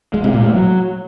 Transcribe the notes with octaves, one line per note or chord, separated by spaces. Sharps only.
G#3
C3
A#2
A3
F#3